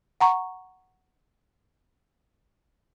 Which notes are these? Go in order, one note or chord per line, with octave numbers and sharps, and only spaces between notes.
F#5 A#5 C#6